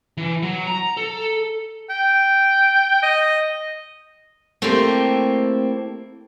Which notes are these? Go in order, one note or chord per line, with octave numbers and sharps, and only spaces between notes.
E3
F#3
A#5
A4
G5
D#5
A3 A#3 C4 E4 G4 C5